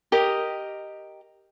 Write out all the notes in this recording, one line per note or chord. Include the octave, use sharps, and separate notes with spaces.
G4 A#4 D#5